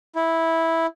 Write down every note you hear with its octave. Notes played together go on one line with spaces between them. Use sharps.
E4